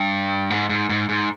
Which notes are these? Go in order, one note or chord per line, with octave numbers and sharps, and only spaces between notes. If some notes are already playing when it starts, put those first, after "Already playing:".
Already playing: G2
G#2
G#2
G#2
G#2